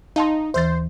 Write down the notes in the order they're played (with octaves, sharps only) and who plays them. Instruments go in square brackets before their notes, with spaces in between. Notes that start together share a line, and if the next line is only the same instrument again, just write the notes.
[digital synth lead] D#4 [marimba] F5 A5 C6
[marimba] D#2 E3 A6 [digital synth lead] C5